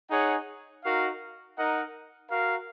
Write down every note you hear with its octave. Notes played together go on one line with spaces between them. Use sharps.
D#4 G#4 C#5 F#5
D#4 F#4 A#4 F5
D#4 A#4 D#5 F#5
F#4 A#4 F5